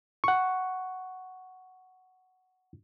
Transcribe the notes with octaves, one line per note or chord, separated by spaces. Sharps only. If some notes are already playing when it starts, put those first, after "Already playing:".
F#5 C#6